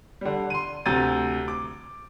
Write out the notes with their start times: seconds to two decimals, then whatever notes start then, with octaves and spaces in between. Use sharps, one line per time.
0.21 D3 G3
0.50 C6 D#7
0.86 D2 C3 A#5 G6 A6 D#7
1.48 D6